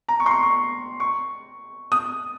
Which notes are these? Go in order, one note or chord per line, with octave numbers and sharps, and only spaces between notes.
A#5
C#6
C6
C#6
C#6
C#6
D#6